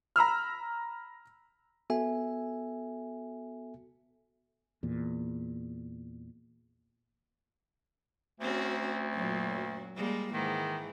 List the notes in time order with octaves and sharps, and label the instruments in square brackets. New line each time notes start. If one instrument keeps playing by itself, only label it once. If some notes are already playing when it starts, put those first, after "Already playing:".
[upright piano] A#5 B5 E6 F6
[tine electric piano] B3 F#4 A4 E5 G#5
[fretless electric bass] E2 A#2
[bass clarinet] D2 [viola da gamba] C4 C#4 F#4
[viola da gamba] F#2 A#2 F#3
G3 G#3 A#3
[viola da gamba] G#2 E3 [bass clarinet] D#3